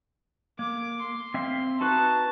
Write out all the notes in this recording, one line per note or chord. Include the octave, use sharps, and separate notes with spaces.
A#3 D6
C6
C4 E5 F5
D#4 F#4 B4 A5